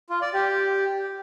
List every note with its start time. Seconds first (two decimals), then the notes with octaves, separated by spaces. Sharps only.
0.10 F4
0.22 D5
0.34 G4